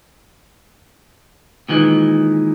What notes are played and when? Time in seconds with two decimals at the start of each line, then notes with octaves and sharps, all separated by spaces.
1.69 A#2 D#3 E3 G#3